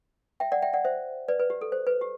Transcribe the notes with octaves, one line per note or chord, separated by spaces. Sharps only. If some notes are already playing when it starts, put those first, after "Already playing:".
E5 G5
D5 F#5
E5 G5
D5 F#5
C5 E5
B4 D5
B4
G4
A4
C5
B4
G4